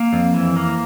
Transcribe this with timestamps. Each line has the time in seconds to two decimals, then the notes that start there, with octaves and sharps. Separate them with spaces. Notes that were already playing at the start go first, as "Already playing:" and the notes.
Already playing: A#3 F5
0.13 F2
0.34 E3
0.57 A#3